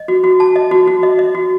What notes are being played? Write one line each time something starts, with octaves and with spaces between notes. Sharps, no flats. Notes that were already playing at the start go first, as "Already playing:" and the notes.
Already playing: D#5
F#4
F#4
A5
D#5
F#4
F#4
D#5
D#5
F#4